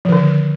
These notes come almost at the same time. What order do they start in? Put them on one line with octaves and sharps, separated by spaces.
F3 D#3 D3